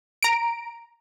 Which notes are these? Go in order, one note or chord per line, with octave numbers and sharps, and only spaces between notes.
A#5 D7